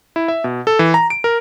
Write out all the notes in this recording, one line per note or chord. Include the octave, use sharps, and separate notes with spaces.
E4
E5
B2
A4
E3
A#5
D7
A#4